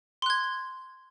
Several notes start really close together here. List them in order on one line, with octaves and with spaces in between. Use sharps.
C6 F#6 G#6